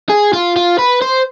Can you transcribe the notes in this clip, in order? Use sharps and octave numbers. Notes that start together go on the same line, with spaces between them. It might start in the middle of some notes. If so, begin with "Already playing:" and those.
G#4
F4
F4
B4
C5